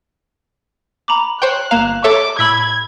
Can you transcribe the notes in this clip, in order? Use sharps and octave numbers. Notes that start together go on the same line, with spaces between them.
A#5 B5 D6
C5 C#5 G5 F#6
G1 A#3 F5 A#5 E7
A4 C#5 E5 D6
A2 B5 E6 G#6 B6